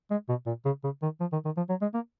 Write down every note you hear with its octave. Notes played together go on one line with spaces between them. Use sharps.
G#3
B2
A#2
C#3
C#3
D#3
F3
D#3
D#3
F3
F#3
G#3
A#3